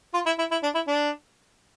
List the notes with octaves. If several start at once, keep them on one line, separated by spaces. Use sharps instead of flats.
F4
E4
E4
E4
D4
E4
D4